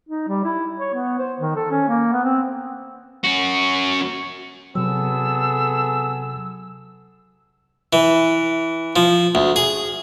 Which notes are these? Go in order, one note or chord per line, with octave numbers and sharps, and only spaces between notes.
D#4
G3
E4
C#5
B3
C5
D#3
A4
C#4
A#3
B3
C4
C#4 F#4
C3 F#3 B3 G#4 A4 E6
E3
F3
D2
G#4